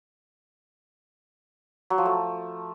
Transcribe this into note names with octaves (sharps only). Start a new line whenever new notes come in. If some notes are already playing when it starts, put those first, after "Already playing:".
F#3
F3
A3